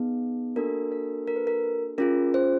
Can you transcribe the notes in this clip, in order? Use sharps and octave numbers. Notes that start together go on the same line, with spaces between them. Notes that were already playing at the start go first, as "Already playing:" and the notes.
Already playing: B3 D#4 G#4
A#3 D4 F#4 A4 A#4
A#4
A#4
B4
A#4
C#4 F4 G#4 A#4
C5